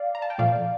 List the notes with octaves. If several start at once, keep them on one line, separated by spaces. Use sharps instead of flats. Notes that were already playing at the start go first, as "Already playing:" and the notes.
Already playing: D5 F5
A#5
A5
G5
A#2 F3 A3 D5 F5